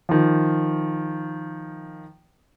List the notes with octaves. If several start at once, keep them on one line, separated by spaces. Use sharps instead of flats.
D#3 F3